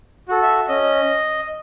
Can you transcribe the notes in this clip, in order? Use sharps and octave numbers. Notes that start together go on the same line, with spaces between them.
F#4 A4
E5
C#4 D#5